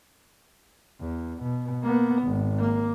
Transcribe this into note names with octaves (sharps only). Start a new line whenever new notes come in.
E2
B2
A#3 B3
G#1
A#3